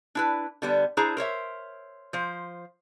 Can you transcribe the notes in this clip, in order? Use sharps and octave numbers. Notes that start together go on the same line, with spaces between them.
D4 E4 B4
D3 G3 B3
D4 E4 G#4 C5 A#5
A#4 C5 C#5 E5
F3 C5